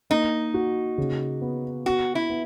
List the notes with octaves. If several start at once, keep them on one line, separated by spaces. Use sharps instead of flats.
A#3 D#4
F#4
C#3
B3
B3 F#4
E4
B3